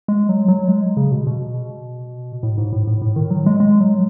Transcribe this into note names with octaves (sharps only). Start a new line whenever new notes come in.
G#3
F#3
F#3
G#3
C#3
B2
B2
A2
G#2
A2
A2
A2
D#3
F#3
G#3
G#3
F#3